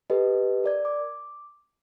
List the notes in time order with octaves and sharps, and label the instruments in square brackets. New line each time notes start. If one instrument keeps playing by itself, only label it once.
[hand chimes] G4 A4 B4 D#5
A#4 D5 G#6
D6